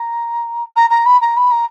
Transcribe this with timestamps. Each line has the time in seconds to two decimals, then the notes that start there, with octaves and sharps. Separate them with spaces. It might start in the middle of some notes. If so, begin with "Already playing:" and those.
Already playing: A#5
0.76 A#5
0.90 A#5
1.05 B5
1.21 A#5
1.36 B5
1.51 A#5